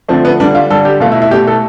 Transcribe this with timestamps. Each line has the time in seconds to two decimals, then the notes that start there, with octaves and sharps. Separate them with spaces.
0.09 D3 F3 A3 C4
0.25 B3
0.40 D3 G3 D4
0.55 F4
0.70 D3 G3 A4
0.85 G4
1.00 B2 A3 F4
1.12 E4
1.22 E4
1.31 B2 A3 G4
1.47 A4